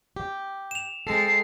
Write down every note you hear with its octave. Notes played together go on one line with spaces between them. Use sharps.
G4
E7 F7
G#3 C4 A4 A5 C7